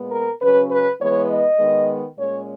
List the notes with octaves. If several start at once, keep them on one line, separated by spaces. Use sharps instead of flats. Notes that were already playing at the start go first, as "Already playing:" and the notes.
Already playing: A#2 G#3 B3
A#4
C#3 F#3 C#4 B4
B4
E3 G#3 B3 C#5
D#5
D#3 G#3 B3
A#2 G#3 C#4 C#5